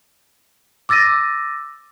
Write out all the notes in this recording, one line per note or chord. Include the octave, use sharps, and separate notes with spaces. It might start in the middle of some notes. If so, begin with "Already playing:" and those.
D6 E6 A6 A#6 D#7